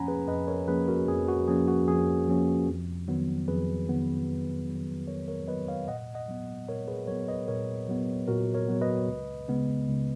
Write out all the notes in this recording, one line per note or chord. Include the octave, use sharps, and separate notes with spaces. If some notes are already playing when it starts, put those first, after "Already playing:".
Already playing: F2 F3 A#3 C#4 F#5 G#5 A#5 B5
G#4 B4
F2 B4 D#5
A#4 C#5
F3 A#3 C#4 G#4 B4
F#4 A#4
F2 G#4
F#4
F3 A#3 C#4 G#4
F#4
F2 G#4
F3 A#3 C#4
F2
D#3 F#3 B3
F2 G#4 B4
D#3 F#3 B3
F2
D#3 F#3 B3
F2 A#4 C#5
A#4 C#5
D#3 F#3 B3 B4 D#5
C#5 F5
A#2 D#5 F#5
D#5 F#5
F#3 B3
A#2 A#4 C#5
G#4 B4
F#3 B3 A#4 C#5
B4 D#5
A#2 A#4 C#5
F#3 B3
A#2 F#4 A#4
A#4 C#5
F#3 B3
B4 D#5
C#2
C#3 G#3 B3
C#2